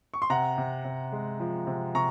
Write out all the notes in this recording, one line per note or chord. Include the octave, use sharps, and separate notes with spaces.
C#6
C6
C3 F#5 A#5
C3
C3
G#3
F3
C3
C3 A#5 C#6